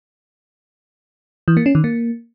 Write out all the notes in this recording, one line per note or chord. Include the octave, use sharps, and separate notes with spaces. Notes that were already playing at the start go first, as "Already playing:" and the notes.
E3
A#3
C#4
D#3
A#3